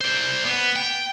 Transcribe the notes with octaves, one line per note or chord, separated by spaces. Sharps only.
C5 D5
B3
G5